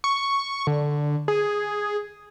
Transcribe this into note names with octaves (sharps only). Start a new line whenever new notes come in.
C#6
D3
G#4